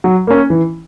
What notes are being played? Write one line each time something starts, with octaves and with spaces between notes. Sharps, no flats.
F#3
A#3 C#4
E3